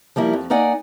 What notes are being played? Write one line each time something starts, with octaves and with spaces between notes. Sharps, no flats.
F3 G3 A#3 E4
F2
A#3 D#4 D5 F#5 G#5